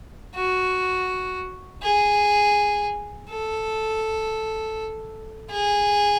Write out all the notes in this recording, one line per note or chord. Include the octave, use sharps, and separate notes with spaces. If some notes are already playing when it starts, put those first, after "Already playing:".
F#4
G#4
A4
G#4